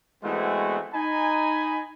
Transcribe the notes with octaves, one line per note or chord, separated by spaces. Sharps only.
E3 G#3 A3 B3 C4 F#4
D#4 G#5 B5